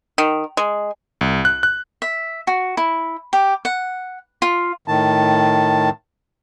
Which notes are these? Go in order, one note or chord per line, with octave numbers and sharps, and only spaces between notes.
D#3
G#3
C2
F#6
F#6
E5
F#4
E4
G4
F#5
F4
A2 D#3 A5